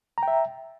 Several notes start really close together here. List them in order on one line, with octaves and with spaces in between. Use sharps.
A#5 G5 E5